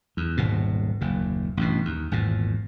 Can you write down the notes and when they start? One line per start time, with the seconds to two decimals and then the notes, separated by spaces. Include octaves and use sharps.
0.17 E2
0.37 D#1 G#1 G#2 B2
1.01 F#1 D#2 A#2
1.57 A1 G2 B2
1.85 D#2
2.12 G#1 E2 A#2